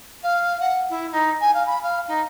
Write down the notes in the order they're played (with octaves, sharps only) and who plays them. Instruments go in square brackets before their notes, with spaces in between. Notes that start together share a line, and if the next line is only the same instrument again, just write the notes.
[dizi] F5
F#5
E4
D#4
G#5
F5
B5
F5
D#4